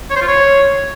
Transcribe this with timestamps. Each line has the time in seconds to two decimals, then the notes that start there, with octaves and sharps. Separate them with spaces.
0.10 C#5
0.16 C5
0.22 F4
0.28 C#5